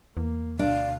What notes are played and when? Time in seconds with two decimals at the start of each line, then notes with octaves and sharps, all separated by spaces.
0.17 E2 A#3
0.59 D2 B2 D4 F5